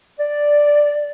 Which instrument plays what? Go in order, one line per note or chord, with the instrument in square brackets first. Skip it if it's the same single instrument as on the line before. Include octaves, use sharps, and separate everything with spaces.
[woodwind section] D5